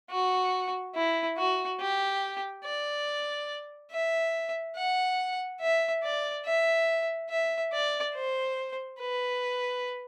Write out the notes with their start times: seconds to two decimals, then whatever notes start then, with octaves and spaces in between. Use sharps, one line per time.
0.10 F#4
0.95 E4
1.38 F#4
1.80 G4
2.64 D5
3.92 E5
4.77 F#5
5.61 E5
6.03 D5
6.46 E5
7.30 E5
7.72 D5
8.15 C5
9.00 B4